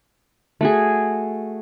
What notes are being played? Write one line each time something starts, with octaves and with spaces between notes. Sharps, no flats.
A3 F#4 G#4